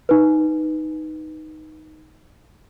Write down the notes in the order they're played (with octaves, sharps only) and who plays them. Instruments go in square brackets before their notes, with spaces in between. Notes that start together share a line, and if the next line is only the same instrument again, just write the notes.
[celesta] D#4 B4